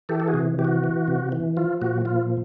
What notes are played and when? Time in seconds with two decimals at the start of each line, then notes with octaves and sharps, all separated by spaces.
0.09 E3 G4 A4
0.20 A4
0.28 F#4 G#4
0.34 C3
0.59 E3 G4
0.65 F#4
0.84 E3
1.08 C3
1.32 E3
1.57 F3 F4
1.82 A#2 F#4
2.05 F3 F4